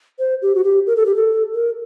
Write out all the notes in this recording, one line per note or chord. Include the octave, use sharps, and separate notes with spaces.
C5
G4
F#4
G4
A#4
A4
G4
A4
A#4